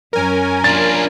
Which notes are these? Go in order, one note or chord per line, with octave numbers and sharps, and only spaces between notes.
F#2 C#4 A#4 G#5
D4 F4 A6